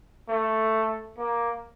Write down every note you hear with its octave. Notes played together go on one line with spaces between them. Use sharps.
A3
A#3